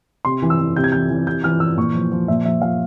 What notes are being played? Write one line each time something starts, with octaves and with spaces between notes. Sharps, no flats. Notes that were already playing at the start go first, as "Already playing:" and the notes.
C3 C6
E3
E6
E3
C3 G6
G#6
E3 G6
E3
C3 G6
E3 F6
E3 E6
A#2 C#6
F3
F3
A#2 E5
F3 E5
F3 F5